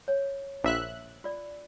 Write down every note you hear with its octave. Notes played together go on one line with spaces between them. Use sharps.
C#5
A#1 E5 F#6
F4 D5